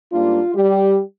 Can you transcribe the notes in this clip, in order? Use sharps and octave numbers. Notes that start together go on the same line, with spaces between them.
G#2 G3 A#3 D4 F4
G3 G4